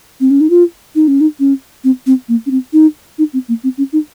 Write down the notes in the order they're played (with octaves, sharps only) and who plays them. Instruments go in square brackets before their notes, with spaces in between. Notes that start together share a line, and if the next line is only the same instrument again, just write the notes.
[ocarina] C4
C#4
D#4
F4
D#4
C#4
D#4
C#4
C4
C4
A#3
C#4
C4
D#4
D#4
C4
A#3
C4
C#4
D#4